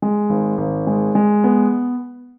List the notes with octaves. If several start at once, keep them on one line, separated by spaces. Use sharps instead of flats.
G#3
G#1
G#1
G#3
G#3
B3